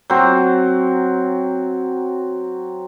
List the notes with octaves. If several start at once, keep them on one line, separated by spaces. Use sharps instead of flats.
F#3 C4